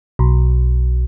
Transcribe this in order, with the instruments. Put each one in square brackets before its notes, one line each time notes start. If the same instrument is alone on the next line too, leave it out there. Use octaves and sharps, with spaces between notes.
[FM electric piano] B1